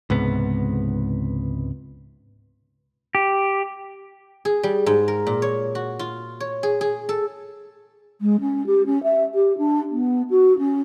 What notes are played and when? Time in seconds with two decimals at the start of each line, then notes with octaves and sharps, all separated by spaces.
0.10 C#2 G#2 C3 B3
3.15 G4
4.45 G#4
4.63 G3
4.86 G#2
5.08 A#4
5.27 A#2
5.42 C#5
5.75 F#4
5.99 F4
6.40 C#5
6.63 G#4
6.81 G#4
7.09 A4
8.21 G#3
8.40 C#4
8.66 G4
8.86 C#4
9.03 E5
9.34 G4
9.58 D4
9.91 B3
10.30 F#4
10.58 C#4